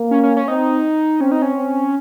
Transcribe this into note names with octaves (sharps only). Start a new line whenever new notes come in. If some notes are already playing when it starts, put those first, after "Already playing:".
Already playing: A#3
C#4
C#4
C#4
C4 D#4
C4 C#4
D#4
C#4
C4